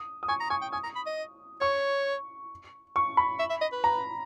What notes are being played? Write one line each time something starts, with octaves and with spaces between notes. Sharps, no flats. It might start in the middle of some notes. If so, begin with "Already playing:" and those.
Already playing: D#6
D#6
G#5 C#6
A#5
G#5 C#6
G5
G#5 D#6
A#5
B5
D#5
C#5 C#6
C#6
B5
E5
E5
D#5
B4
A#5